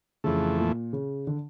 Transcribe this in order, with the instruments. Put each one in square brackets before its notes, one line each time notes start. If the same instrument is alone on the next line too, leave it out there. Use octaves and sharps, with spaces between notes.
[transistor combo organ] F2 E3 A3 [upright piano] C#3
[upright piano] A#2
C#3
D3